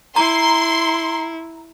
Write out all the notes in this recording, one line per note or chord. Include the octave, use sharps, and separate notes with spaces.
E4 A#5 C6